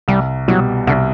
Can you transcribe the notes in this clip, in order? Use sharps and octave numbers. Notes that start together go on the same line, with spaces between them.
C2 G3
B2 F#3 G3
C2 D3